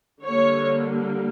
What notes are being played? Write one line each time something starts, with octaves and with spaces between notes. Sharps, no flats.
D3 G3 A#3 C#5